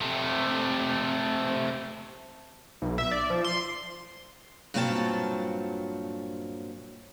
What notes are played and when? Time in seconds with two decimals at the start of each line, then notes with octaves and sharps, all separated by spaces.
0.01 C3 A3
2.82 B1
2.98 E5
3.11 D5
3.30 F3
3.44 C6
4.74 G2 A#2 F#3 C4 F#4 A5